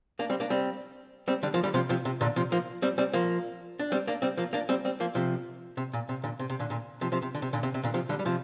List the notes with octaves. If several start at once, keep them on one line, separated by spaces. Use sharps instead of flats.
A#3 D4
G3 C4
A#3 D4
G3 C4
G3 C4
D3 G3
F3 A#3
D3 G3
C3 F3
C3 F3
C3
A#2 D3
C3 F3
F3 A#3
G3 C4
G3 C4
F3 A#3
D4
G3 C4
A#3 D4
G3 C4
F3 A#3
A#3 D4
G3 C4
G3 C4
F3 A#3
C3 F3
C3
A#2
C3
A#2 D3
C3
C3
A#2 D3
A#2 D3
C3 F3
C3 F3
C3
D3
C3
A#2 D3
C3
C3
A#2 D3
C3 F3
D3 G3
G3
C3 F3